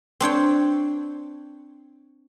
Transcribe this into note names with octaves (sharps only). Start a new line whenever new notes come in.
C4 D4 C#5 G5